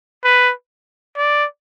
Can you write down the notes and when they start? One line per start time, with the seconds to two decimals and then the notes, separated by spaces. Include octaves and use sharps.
0.24 B4
1.18 D5